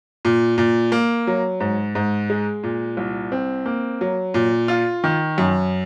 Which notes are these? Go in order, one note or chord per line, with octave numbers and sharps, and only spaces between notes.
A#2
A#2
A#3
F#3
G#2
G#2
G#3
A#2
C2
C4
A#3
F#3
A#2
F4
D#3
F#2